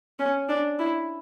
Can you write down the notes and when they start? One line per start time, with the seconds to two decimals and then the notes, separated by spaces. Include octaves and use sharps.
0.19 C#4
0.49 D4
0.79 E4